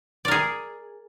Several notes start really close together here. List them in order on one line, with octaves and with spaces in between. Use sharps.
D5 A#4 G#4